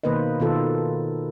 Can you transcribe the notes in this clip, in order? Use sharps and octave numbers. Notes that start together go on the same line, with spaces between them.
B2 D#3 A#3 B4 C5 D#5
B2 D#3 F4 A4